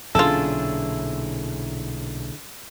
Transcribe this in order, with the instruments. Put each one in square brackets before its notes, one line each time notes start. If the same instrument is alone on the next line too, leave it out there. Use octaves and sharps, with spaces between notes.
[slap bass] B1 A#2 C#4 [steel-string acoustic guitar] D3 E4 G#4 [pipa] F4 A4